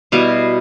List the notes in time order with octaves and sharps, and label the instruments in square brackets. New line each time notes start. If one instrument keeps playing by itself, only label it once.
[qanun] B2 G3 B3 E4 F5